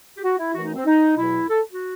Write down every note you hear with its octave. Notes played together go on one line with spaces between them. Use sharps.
G4
F#4
E4
F#2 E3 A3 F#4
D#4
C4
D#4
E2 B2 F#3 E4
A4
F#4